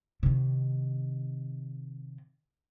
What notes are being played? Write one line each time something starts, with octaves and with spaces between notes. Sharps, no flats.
C3 D#3